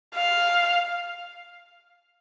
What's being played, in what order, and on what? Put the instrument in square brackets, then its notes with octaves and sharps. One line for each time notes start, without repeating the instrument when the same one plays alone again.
[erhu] F5